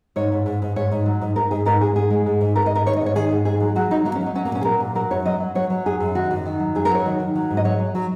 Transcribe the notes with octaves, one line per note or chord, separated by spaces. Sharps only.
G#2 C#5
G#2
G#2
G#2
G#2 C#5
G#2
F#3
G#2
G#2 A#4
G#2 G#4
G#2 A#4
G#2 G#4
G#2 G#4
G#3
G#2
G#2
G#2 A#4
D#5
G#2 A#4
D#3 C#5
D#5
G#2
C#5
D#3 G#4
G#2
G#2 G#4
F#3
F#3 F#4
F#3 D#4
F#3 A#3
C#4
F#3
D#4
F#3 C#4
A#3
A#2 C#4
G#4
F#3 A#4
A#2
F#3 A#4
F#2 C#5
F#3 D#5
F#3
F#3 C#5
F#3
F#2 G#4
F#2
D#3 F#4
F#2
D#3
F#3
F#2 G#4
A#4
F#3 C#5
D#3
D#3
F#3
G#2
D#5
F#3 C#5
F#3
F#3